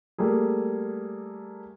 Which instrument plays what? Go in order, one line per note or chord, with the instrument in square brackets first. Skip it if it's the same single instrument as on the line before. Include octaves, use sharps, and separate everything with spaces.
[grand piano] G3 A3 A#3 G#4